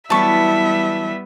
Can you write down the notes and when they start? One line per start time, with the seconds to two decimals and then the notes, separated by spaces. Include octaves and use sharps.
0.10 E3 F#3 G3 B3 E5 A5 C#6